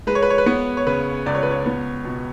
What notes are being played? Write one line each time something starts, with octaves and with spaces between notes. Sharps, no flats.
G#3 B4
C#5
B4
C#5
B4
B3 C#5
C#5
C#3 B4
C#2 D5
C#5
B4
C#5
B3
B2